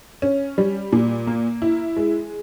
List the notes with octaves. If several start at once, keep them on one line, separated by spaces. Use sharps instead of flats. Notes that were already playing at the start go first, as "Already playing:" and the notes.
C#4
G3
A#2
A#3
E4
G#3